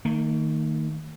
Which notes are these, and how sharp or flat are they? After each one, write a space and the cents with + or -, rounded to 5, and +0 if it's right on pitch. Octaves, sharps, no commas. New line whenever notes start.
D#3 +0 A#3 -45